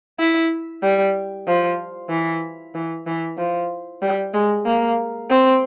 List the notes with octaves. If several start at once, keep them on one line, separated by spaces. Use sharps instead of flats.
E4
G3
F3
E3
E3
E3
F3
G3
G#3
A#3
C4